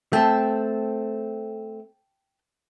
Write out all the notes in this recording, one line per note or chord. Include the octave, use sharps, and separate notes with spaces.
A3 C4 G5 A5